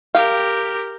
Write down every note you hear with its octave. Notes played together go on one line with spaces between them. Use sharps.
G4 A#4 F5 G5